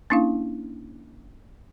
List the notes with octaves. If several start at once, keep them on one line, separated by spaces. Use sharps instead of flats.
A#3 C#4 D4 E4 F5